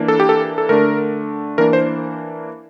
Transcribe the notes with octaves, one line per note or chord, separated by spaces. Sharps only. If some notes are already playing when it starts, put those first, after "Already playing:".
Already playing: E3 A#3 D4
A4
G4
A4
A4
D3 A3 D4 A#4
E3 A#3 D4 A#4
C5